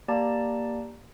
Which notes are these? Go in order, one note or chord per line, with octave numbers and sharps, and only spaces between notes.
A#3 G4 D5 A5 A#5